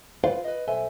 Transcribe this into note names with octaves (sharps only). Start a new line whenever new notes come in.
F4 B4 C5 F5
B4 D#5
B1 A4 C5 E5 G#5